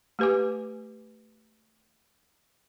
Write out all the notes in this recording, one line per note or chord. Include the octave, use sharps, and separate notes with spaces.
A3 G4 B4 G#5 D6